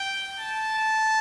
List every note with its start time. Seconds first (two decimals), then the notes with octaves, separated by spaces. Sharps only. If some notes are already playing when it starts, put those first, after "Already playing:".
Already playing: G5
0.39 A5
0.78 A5